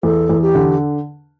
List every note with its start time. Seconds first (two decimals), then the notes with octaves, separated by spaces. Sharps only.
0.03 E2 A4
0.29 E2
0.42 G4
0.55 D3